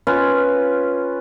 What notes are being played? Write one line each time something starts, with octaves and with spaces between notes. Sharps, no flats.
C#4 F4 B4